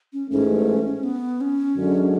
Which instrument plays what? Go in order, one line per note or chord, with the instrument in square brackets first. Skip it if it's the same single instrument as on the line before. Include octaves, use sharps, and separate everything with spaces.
[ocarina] C#4
[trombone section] A1 G#2 E3 A3 [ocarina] C#4
[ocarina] B3
C#4
[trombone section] F#2 D3 G#3